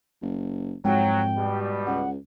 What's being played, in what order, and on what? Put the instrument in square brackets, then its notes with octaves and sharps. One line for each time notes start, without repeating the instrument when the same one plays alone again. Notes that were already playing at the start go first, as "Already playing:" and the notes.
[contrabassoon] F#1
[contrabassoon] F2 [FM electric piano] G#2 [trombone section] F#3 [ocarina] G5
[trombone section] B2 G3
[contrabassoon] C#2 [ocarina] F#5